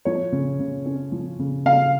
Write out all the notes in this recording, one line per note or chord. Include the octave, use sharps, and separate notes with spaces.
F3 C#5
C#3
C#3
C#4
F3
C#3
C#3 F5